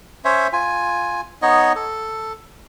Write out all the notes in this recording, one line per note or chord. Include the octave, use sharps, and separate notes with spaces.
C#4 C5 C#5 E5
F4 G#5
B3 D#4 C#5 D#5
A4